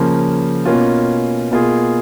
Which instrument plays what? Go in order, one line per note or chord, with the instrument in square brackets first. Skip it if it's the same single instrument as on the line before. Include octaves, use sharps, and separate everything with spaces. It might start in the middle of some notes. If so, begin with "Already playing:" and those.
Already playing: [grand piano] C#3 F3 A#3 C#4
B2 A#3 C#4 F4
B2 A#3 F4 G#4